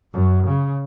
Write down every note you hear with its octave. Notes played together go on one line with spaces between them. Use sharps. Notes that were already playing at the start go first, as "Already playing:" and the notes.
F#2
C#3